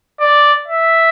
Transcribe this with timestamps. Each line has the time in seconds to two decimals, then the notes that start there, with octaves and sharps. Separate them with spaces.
0.20 D5
0.68 E5